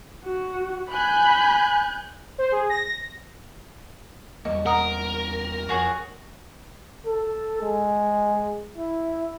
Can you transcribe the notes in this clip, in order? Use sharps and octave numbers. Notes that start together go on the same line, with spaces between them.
F#4
G#5 B5 F#6 G6
C5
G#4
A#6
A#6
E2 G3 A#3 D#5 C#6
A#4 F#5 A#5 D#6
F2 F#4 G#4 C#5
A4
G#3
E4